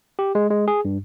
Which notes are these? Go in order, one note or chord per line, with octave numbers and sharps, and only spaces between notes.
G4
G#3
G#3
G#4
G2